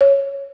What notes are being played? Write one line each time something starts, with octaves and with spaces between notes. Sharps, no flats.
C#5